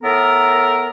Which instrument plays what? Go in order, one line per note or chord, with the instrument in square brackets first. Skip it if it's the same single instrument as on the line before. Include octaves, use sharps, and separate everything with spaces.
[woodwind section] A2 B3 A4 A#4